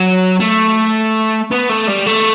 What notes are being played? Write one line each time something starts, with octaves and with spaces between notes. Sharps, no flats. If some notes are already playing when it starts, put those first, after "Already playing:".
Already playing: F#3
A3
B3
A3
G3
A3